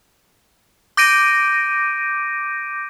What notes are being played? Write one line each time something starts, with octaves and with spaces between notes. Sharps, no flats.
D6 G6 A#6 D7 D#7